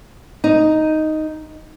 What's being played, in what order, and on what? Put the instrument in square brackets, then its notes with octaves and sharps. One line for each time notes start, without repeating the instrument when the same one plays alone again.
[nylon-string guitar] D#4